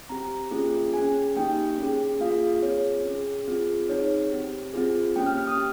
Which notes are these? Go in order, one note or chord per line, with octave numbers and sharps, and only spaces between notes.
C4 G4 A#5
A#3 C#4 F4 G#4
C#4 G#4 G#5
A#3 D#4 G4 G5
C#4 G#4
A#3 F4 G#4 F5
C4 F4 G#4 C#5
C#4
G#4
C4 F4 G#4
C4 D#4 G#4 C#5
C4 G4
C4 F4 G#4
A#3 C#4 G4 G5
F6
F6
D#6
G4